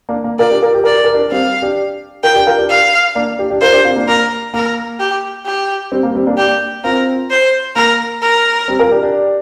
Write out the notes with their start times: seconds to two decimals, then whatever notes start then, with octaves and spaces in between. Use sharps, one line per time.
0.09 A#3 D4
0.24 A#3
0.39 F4 A#4 D5
0.51 D4 G4
0.62 F4 A#4
0.74 G4
0.84 A#4 D5
0.94 G4
1.04 A#4
1.14 D4 G4
1.32 G3 C4 F5
1.62 D4 G4
2.23 F4 A#4 G5
2.35 D4 G4
2.47 F4 A#4
2.58 D4 G4
2.70 F5
3.15 A#3 D4
3.39 D4 G4
3.50 D4 G4
3.62 F4 A#4 C5
3.73 D4 G4
3.85 C4 F4
3.96 A#3 D4
4.08 A#3 A#4
4.54 A#3 A#4
5.00 G4
5.46 G4
5.92 G3 C4
6.03 A#3
6.15 G3 C4
6.27 A#3 D4
6.37 A#3 D4 G4
6.84 C4 F4 A#4
7.31 C5
7.76 A#3 A#4
8.22 A#4
8.68 G3 C4
8.79 F4 A#4
8.91 D4 G4
9.03 D4 G4